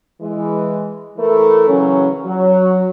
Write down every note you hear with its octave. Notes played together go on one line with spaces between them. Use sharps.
E3 G#3
E3 A3 E4 A#4
C#3 E3 F#3 C#4
F#3